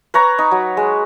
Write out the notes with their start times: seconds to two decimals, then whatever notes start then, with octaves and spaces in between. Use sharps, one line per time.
0.14 B4 C#5 A#5
0.38 D#4
0.51 F#3
0.77 G#3